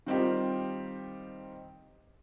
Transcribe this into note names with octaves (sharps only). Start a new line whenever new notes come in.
D#3 G3 C4 D#4 F4 G4